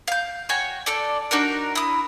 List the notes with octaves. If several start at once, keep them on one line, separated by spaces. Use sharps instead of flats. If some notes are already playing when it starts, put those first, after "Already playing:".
F5 G6
F#4 C#5 G5 G#5
D4 A4 D5
D4 D#4 F#4 A#4
E4 D#6